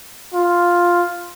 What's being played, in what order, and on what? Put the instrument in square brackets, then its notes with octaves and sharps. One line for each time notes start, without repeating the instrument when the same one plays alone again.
[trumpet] F4